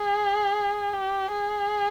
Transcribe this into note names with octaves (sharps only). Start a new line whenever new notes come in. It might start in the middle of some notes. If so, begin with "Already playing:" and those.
Already playing: G#4
G4
G#4